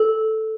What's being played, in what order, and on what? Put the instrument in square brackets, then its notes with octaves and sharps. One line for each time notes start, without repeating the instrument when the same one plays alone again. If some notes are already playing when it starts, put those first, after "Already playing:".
Already playing: [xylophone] A4